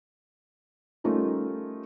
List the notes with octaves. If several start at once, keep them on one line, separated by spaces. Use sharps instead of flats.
G3 A3 C#4 D#4 F4 A#4